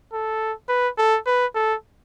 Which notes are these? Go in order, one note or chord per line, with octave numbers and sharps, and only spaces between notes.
A4
B4
A4
B4
A4